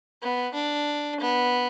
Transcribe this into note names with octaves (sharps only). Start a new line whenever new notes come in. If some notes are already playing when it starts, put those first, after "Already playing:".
B3
D4
B3